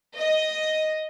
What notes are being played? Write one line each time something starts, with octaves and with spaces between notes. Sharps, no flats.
D#5